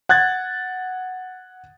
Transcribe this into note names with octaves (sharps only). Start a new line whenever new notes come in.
F#5 F#6 G#6 A6